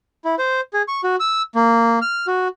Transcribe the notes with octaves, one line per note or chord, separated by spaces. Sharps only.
E4
C5
G#4
C#6
F#4
E6
A#3
F6
F#4